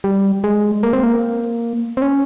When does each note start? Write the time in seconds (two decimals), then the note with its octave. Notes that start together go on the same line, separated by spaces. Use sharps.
0.04 G3
0.44 G#3
0.83 A#3
0.93 C4
1.03 A#3
1.97 C4
2.02 C#4